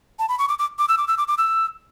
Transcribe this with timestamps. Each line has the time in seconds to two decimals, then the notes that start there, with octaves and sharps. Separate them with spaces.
0.19 A5
0.29 B5
0.39 C#6
0.49 D6
0.59 D6
0.79 D6
0.88 E6
0.98 D6
1.08 E6
1.18 D6
1.28 D6
1.38 E6